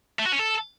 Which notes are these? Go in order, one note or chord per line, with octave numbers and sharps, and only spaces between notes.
A3
F#4
C#4
A4